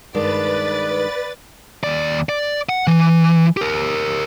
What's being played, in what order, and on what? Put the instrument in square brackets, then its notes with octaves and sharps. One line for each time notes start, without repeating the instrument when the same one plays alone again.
[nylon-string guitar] G2 D#3 G#3 [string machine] B4 A6 [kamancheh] D5
[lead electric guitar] D#2 D5
D5
F#5
E3
G4 A#4